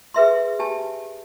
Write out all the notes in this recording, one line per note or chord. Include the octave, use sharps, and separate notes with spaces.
G#4 B4 E5 C6
G4 G#5 A5